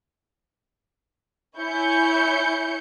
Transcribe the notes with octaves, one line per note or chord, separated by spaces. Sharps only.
E4 C#5 G#5 G6 C#7